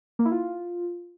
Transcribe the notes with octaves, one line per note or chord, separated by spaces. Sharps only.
A#3
E4
F4